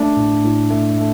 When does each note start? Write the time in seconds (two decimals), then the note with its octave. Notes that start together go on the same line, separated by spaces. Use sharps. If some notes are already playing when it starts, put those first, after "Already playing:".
Already playing: A3 D4
0.17 A2
0.44 A2
0.70 A3
0.98 A3